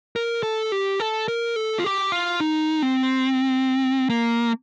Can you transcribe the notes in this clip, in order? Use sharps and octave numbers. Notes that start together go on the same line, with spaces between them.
A#4
A4
G4
A4
A#4
A4
F4
G4
F4
D#4
C4
A#3